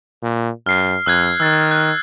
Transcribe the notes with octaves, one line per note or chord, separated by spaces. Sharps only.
A#2
F#2 F6 C7
F2 E6 F#6 G#6
D#3 E6 A6
F#6